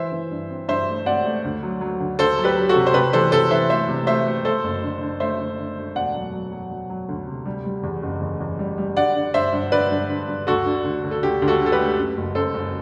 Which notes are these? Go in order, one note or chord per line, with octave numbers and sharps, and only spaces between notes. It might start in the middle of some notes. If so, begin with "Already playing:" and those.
Already playing: E3 C5 E5
E3
G2
C4
G2 C5 E5
A3
C4 D5 F#5
A3
D2
F#3
F#3
D2
D2 A4 C5
F#3
G4 B4
F#3
F#4 A4
C3
C5
C3 G4 B4
E3 A4 C5
C3 A4 C5
E3 C5 E5
A3 C5 E5
C3
A3 C5 E5
A3
A3 A4 C5
F#1
D3
D3
A3 C5 E5
D3
D3
A3
E1 D5 F#5
F#3
F#3
F#3
F#3
F#3
D2
C3
G3
G3
E2
F#1
E2
E2
G3
G3
D3 D5 F#5
D3
G2 C5 E5
G2
D3 B4 D5
G2
D3
G2
D2 F#4 A4
D3
D2
D2
A4
D2 G4
D2
F#4 A4
D3
A4
G4 B4
A3
F#2
F#1
F#2 A4 C5
F#1